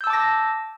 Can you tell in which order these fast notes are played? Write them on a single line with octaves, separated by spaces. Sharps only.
G6 E6 A5 D6 A#6